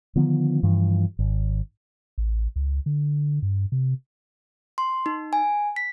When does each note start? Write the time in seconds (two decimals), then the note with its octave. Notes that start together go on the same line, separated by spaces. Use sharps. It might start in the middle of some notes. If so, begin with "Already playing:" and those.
0.16 D3 D#3 F3 B3
0.63 G2 E3 F3
1.19 G#1
2.18 A1
2.56 C#2
2.86 D3
3.42 G2
3.72 C3
4.78 C6
5.06 D#4
5.33 G#5
5.76 B6